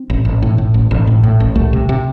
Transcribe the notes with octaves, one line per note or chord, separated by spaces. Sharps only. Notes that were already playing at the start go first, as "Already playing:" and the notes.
Already playing: C4
A1
A1
A2
A2
A1
A1
A2
A2
A1
C2 A3
C3
C3